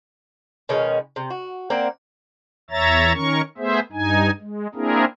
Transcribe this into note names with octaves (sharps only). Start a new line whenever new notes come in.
B2 D#3 G#3 C#4
C3
F#4
A#3 C4 D5 F#5
E2 C#5 E5 A#5 A6
D#3 C#4 A#4 C#6
A3 B3 G#4 C5 E5
G2 D#4 G#5
G#3
A#3 C4 D4 E4 G#4 A#4